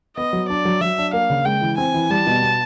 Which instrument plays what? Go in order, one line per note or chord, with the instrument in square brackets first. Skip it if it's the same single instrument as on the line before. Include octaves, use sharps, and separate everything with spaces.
[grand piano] B3 [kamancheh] D#5
[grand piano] F#3
[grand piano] D4 [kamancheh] D5
[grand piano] F#3
[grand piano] F#3 [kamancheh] E5
[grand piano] D4
[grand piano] A#3 [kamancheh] F5
[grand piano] C#3
[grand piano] G#3 [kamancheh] G5
[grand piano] E3
[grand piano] C4 [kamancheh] G#5
[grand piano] E3
[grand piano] G3 [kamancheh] A5
[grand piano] B2
B3